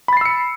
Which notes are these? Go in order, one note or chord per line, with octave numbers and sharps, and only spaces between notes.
B5 E6 A6 C7 C#7